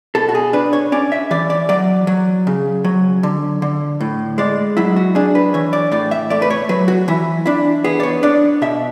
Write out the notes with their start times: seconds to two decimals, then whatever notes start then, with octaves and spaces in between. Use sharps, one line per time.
0.15 B2 A4
0.29 F#4
0.35 G#4
0.53 D4 B4
0.73 C#5
0.92 C#4 D5
1.12 E5
1.31 E3 D5
1.50 D5
1.69 F#3 D5
2.07 F#3
2.47 C#3
2.84 F#3
3.23 D3
3.62 D3
4.01 A2
4.38 G#3 D5
4.77 F#3 E4
4.96 F#4
5.15 D4 G#4
5.35 B4
5.54 E3 C#5
5.73 D5
5.92 A2 D5
6.11 E5
6.30 A3 D5
6.42 B4
6.50 C#5
6.69 F#3 B4
6.88 F#4
7.08 E3 E4
7.46 D4 E4
7.84 B3 G#4
8.00 D5
8.03 C#5
8.23 D4 D5
8.62 B2 E5